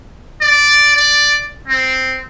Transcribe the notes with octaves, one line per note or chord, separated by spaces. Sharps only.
D5
D5
C4